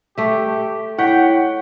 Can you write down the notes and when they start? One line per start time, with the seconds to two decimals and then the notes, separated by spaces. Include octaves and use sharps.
0.18 A3 G4 E5
0.99 E4 C#5 F#5 G5 B6